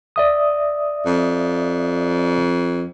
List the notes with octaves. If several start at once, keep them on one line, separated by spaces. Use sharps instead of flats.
D5 E5 D#6
F2